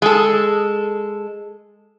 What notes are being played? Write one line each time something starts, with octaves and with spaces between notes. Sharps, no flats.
G#3 A4